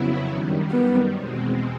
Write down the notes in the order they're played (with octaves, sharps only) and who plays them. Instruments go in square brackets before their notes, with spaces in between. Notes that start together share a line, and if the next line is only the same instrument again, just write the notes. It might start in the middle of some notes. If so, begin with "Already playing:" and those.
Already playing: [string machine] F2 C#3 F#3 B3 E4
F#2 D#3 G3
[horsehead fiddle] B3
[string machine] E2 B2 G#3 C4